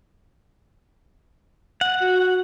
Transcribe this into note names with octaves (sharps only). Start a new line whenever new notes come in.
F#5
F#4